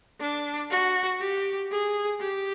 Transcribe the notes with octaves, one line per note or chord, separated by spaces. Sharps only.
D4
F#4
G4
G#4
G4